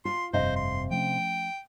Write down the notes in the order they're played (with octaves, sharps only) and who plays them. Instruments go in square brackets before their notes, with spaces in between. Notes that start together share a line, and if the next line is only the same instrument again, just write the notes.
[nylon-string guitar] F4 [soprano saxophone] C6
[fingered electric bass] F1 G2 [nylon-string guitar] C3 D#5 F5 [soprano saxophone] C5
[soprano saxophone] C6
[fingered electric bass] F3 A3 C#4 [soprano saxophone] G5